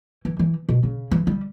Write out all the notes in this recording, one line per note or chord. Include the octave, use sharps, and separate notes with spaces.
E3
E3
B2
C#3
E3
G3